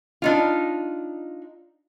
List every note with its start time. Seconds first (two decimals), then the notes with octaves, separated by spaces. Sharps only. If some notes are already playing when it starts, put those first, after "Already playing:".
0.22 D4 D#4 F4